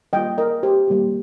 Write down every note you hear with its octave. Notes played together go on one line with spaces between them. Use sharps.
G3 A#3 F4 D#5 G5
A#4 D#5
G4 C5
G3 A#3 G4